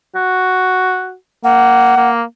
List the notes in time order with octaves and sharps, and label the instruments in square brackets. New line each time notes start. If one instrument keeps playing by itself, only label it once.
[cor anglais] F#4
[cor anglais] A#3 [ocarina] F#5
[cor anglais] A#3